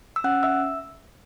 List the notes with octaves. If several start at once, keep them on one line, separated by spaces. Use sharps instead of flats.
E6
C#4 F#5 F#6
E5 E6